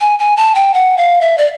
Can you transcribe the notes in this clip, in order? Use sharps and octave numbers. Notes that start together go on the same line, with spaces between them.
G#5
G#5
A5
G5
F#5
F5
E5
D5